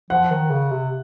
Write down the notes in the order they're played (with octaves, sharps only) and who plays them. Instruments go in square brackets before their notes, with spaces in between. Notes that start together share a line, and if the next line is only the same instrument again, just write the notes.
[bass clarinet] F3 [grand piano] F#5
[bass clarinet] D#3
C#3
C3